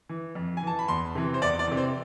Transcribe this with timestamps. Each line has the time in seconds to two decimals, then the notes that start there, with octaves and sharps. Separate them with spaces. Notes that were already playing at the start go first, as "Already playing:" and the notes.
0.09 E3
0.35 F2
0.57 G#5
0.63 E3 A5
0.79 B5
0.88 E2 C6
1.15 C3 E3
1.34 C5
1.42 E2 D5
1.59 D5
1.67 C3 E3
1.77 C5